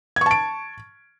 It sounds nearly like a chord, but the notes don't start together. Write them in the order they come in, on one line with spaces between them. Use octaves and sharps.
G#6 C#6 A5 D7